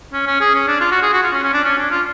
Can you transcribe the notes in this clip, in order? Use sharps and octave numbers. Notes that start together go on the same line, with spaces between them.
C#4
C#4
G#4
C#4
D4
F4
F#4
G#4
F#4
F4
C#4
C#4
D4
C#4
D4
F4